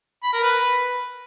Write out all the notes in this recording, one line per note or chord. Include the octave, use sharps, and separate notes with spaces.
B5
A#4
B4